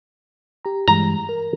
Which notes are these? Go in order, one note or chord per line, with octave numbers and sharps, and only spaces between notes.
G4 A#5
G2 E3 G#3 A#5
A#4